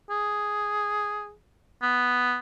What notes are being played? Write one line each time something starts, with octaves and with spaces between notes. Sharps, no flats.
G#4
B3